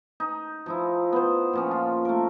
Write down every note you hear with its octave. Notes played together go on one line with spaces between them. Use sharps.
D#4
F3 D#4 E4
B3 C5
A#2 F3 C#4
F4
A3 A#4